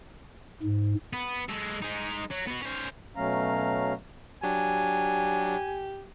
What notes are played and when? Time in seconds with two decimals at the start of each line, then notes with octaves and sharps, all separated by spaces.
0.63 G#2
1.13 B3
1.49 G#3 A4
1.82 G#3 D#4
2.31 F#3
2.47 B3 F#4
2.62 C#4 C5
3.16 B2 F#3 A3 C#4 F5 A#5
4.43 F#3 D4 G4 G#5